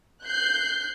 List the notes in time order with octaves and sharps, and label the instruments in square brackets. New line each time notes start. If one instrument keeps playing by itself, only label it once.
[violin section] F#6 G6 C7